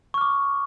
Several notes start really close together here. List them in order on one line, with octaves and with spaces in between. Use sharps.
C#6 F6 D6